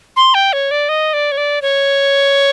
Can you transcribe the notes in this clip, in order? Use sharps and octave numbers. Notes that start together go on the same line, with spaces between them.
C6
G5
C#5
D5
D#5
D5
C#5
D5
C#5